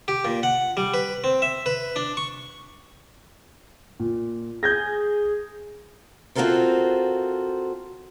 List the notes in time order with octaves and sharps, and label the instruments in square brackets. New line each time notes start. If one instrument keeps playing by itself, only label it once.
[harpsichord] G4
A#2
F#5
G3
B4
C4
E5
B4
D4
C#6
[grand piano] A#2
[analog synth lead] G#4 [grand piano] G6 G#6 A#6
[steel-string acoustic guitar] C4 F4 F#4 A4 A#4 C5